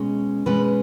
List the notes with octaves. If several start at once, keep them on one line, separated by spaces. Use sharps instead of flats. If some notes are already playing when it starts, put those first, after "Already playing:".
Already playing: B2 G#3 C#4
B2 G#3 C#4 B4